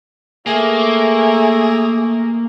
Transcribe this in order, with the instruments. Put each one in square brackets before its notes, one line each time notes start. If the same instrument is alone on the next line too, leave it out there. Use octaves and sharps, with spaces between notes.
[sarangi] A3 [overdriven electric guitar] A#3 [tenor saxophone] G#4